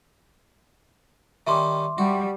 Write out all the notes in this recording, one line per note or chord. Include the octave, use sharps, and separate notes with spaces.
D#3 G3 C#4 E5 C6 D6
G3 F#4